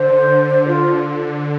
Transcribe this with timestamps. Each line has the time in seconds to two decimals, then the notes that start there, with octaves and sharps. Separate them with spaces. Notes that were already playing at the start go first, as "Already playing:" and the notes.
Already playing: D3 C5
0.68 F4